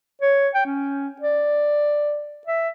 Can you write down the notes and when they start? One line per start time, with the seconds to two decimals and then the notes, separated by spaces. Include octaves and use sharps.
0.21 C#5
0.54 G5
0.66 C#4
1.21 D5
2.47 E5